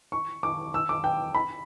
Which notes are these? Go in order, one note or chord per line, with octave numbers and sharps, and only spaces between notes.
C#6
D6
E6
D6
G5
B5